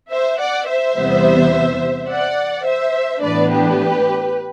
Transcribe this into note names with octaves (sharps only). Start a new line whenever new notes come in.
C5 E5
D5 F#5
C5 E5
E2 C3 E3 G3 B3
D5 F#5
C5 E5
A2 E3 B3 D4 B4 D5
G4 B4